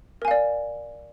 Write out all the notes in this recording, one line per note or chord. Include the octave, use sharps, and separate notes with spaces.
A#4 D5 F5 G#5